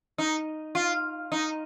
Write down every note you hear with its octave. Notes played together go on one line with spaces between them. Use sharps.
D#4
F4
D#4